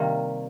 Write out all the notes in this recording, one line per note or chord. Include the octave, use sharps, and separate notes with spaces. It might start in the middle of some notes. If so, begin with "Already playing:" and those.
Already playing: C3 D#3 G3 A#3